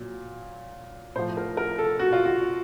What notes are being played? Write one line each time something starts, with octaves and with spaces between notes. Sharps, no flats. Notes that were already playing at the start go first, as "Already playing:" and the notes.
Already playing: A#2 F#3
A2 F3 C5
A#4
A#4
A4
F#4
F4
F#4